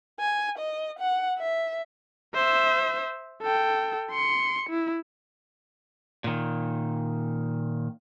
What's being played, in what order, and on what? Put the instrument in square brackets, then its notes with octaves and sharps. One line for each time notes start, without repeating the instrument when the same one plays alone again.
[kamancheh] G#5
D#5
F#5
E5
[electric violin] C5 E5
A4 G5
C6 C#7
E4
[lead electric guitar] A#2 D#3